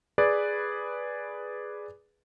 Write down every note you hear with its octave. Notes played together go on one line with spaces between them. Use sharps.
G#4 B4 D5